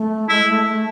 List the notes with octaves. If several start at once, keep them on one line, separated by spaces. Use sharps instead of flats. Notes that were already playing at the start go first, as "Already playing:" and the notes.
Already playing: A3
G#3 E4
A3
A3